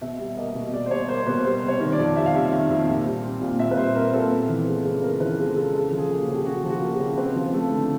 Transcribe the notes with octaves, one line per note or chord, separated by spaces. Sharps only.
B2 E5
G3
A#3 D#5
B2
B2 D5
C5
G3 C#5
A#3 C5
B2 B4
G3 C5
C3 C5
C#5
D#3
D5
F2
G3 E5
F5
C3 E5
D#3
F2
A#2
G3
C4
A#2
A#2 E5
B4
G3 C5
C4 A#4
A#2 A4
B3
E3
G#3
C#3
B3 A#4
E3 B4
G#3 A4
C#3 A4
C#3 A4
F3
G#4
A#3
F#4
C#3
G4
C#3 F#4
F3
F#4
A#3
G4
C#3
C4 B4
F3
A3
D3